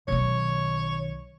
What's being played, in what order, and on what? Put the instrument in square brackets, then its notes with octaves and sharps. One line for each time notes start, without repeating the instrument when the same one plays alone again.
[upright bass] B1 D#3 [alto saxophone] C#5